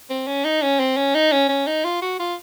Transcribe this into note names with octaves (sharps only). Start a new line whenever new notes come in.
C4
C#4
D#4
C#4
C4
C#4
D#4
C#4
C#4
D#4
F4
F#4
F4